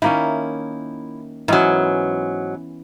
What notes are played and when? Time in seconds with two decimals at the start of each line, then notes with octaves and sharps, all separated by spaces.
0.02 D#3 A#3 C#4 E4
1.48 G#2 E3 F#3 B3 C#4